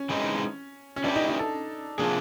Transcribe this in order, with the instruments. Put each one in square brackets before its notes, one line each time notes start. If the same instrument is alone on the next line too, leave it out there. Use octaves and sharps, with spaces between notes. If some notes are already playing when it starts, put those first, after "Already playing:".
Already playing: [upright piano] C#4
[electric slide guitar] E3 G#3 C4 D#4
[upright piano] C#4
[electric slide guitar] E3 G3 B3 E4 G4 [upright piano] D4
[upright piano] D#4
D#4
A4
[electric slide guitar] C3 F3 A#3 D4 [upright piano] G#4